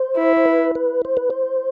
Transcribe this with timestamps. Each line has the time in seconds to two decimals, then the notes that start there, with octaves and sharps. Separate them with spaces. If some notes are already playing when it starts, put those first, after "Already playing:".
Already playing: C5
0.17 E4
0.37 C5
0.46 B4
0.75 B4
1.05 C5
1.17 B4
1.30 C5